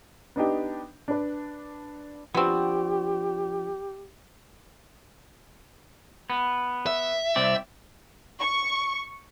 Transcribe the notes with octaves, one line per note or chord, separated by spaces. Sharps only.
B3 D4 D#4 G4
D4 B4
F3 B3 C4 D4 F#4 G4
B3
E5
C2 C4 D5
C#6